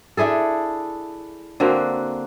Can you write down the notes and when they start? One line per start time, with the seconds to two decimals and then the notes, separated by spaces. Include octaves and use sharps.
0.17 D4 E4 G#4 A4
1.60 D3 A#3 C4 F#4